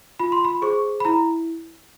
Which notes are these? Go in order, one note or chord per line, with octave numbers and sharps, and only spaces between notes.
F4 B5
C6
B5
G#4 C5 C#6
B5
E4 A#5